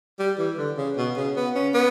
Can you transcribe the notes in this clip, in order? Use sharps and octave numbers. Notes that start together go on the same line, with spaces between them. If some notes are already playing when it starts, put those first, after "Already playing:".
G3
E3
D3
C#3
B2
C#3
B3
C#4
B3